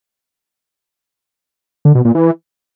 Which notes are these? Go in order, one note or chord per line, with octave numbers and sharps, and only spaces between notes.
D3
B2
A#2
E3